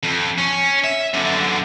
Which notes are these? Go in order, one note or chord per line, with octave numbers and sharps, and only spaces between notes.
F2
C#4
E5
F#2 D3